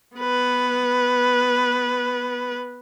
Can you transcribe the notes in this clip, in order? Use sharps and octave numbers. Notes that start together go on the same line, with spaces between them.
B3 B4